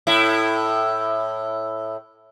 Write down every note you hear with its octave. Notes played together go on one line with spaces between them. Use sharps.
A2 E4